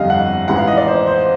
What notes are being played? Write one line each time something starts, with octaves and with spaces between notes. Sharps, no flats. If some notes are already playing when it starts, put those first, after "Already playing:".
Already playing: G1 F2 D3 G3 D#5 F5
F#5
A1 G#2 E3 F#5
F5
D#5
D5
C5
C5